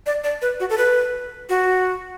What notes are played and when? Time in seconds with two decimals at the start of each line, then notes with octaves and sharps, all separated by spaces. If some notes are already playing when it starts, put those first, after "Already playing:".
0.06 D5
0.24 D5
0.42 B4
0.60 F#4
0.70 A4
0.78 B4
1.49 F#4